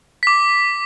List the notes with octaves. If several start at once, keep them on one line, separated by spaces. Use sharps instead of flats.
D6 B6